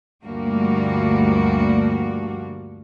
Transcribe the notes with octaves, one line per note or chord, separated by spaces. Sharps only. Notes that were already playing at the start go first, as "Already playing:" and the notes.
D2 G2 F3 G3 A#3 F#4